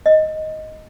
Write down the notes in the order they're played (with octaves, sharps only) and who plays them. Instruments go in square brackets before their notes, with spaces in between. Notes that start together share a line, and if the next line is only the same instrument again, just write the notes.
[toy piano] D#5